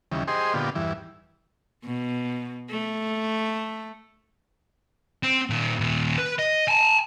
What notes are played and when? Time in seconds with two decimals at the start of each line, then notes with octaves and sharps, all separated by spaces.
0.12 D#2 C#3 E3 G3
0.28 G4 G#4 C5 D#5 C6
0.54 A#2 D3 B3 F4 G4
0.75 E2 G2 E3
1.85 B2
2.70 A3
5.23 C4
5.50 A#2 D#3
5.79 D#2 A#2
6.17 B4
6.38 D#5
6.68 G#5 A5